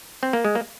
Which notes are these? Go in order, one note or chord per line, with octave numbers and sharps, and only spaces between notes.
C4
A#3
G#3
A#3